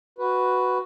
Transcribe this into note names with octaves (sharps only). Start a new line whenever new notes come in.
F#4 B4